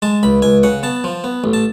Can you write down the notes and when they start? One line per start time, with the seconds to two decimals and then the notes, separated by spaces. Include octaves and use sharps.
0.02 G#3 A5
0.23 C#2 B5
0.42 C#2 G#5
0.63 C#3 F#5
0.83 B3 A5
1.04 F3
1.24 B3
1.44 A1
1.53 A5